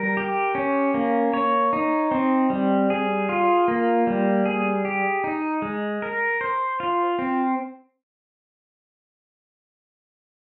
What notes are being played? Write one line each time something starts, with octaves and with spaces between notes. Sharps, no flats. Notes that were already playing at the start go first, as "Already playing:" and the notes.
Already playing: G3 A#4
G4
C#4
A#3
C#5
D#4
C4
G3
G#4
F4
A#3
G3
G#4
G4
D#4
G#3
A#4
C5
F4
C4